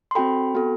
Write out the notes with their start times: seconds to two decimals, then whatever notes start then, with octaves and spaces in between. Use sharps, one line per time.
0.11 C6
0.15 C4 F#4 A4 G5 B5
0.55 B3 F#4 A4